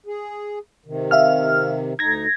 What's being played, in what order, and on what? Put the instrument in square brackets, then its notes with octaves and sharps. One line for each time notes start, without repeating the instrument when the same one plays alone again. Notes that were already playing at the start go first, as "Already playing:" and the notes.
[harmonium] G#4
C3 D#3
[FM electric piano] E5 F5 F6
[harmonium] D2 D#4 [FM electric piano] G#6 A#6